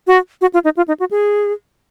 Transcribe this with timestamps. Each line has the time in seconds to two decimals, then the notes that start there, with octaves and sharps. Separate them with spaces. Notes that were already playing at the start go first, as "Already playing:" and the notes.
0.07 F#4
0.41 F#4
0.54 F4
0.64 D#4
0.77 F4
0.88 D#4
1.00 F#4
1.11 G#4